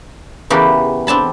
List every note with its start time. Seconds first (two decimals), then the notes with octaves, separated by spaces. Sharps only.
0.50 E2 C#3 E3 F#4 G4 A#4
1.07 C4 D4 A5 B5